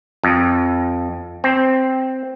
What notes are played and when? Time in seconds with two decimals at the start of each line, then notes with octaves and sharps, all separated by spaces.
0.24 F2
1.44 C4